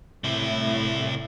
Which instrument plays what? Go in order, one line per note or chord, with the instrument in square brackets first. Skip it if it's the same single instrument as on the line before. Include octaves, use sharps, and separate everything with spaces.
[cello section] A2 [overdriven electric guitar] C3 E4